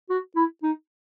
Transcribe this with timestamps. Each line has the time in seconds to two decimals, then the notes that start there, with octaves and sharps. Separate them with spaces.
0.10 F#4
0.36 E4
0.63 D#4